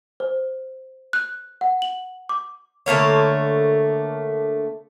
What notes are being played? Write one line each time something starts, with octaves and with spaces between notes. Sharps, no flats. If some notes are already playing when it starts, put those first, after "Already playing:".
C5
F#6
F#5
F#7
D6
D3 A3 A#3 C#5